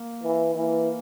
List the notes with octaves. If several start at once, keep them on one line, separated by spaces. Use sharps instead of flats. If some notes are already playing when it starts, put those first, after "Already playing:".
Already playing: A#3
E3
E3 A#3